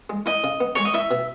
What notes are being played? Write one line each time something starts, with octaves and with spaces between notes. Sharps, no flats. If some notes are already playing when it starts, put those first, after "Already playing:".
G#3
E4 D#5
C#3
B3
G#3 C#5
D#5
E4 E5
B2